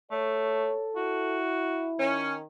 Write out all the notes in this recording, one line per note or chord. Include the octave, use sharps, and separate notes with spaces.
A3 A4 C#5
E4 F#4
D#3 C#4